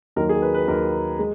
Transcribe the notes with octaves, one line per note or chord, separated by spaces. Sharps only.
D#2 D#3 F#3 A#3 A#4
G#4
B4
B4
D#2 D#3 F#3 A#3 A#4
G#3